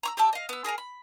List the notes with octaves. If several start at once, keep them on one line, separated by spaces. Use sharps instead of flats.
A#5 C#6 E6
G4 D5 E5 A5
D#5 F5
B3 E6
G#4 A#4 G#5 A#5
B5